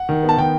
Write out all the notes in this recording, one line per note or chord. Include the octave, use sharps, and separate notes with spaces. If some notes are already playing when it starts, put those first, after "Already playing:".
Already playing: F#5
D#3
B3
A5
D#3 G5